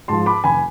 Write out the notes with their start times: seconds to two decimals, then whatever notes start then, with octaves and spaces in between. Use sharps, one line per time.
0.08 G#2 F3 A5 C6
0.26 B5 D6
0.44 F1 G#5 B5